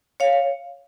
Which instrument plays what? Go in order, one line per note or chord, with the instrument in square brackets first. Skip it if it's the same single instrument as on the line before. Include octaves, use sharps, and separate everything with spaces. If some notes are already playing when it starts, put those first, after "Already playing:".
[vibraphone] C#5 F5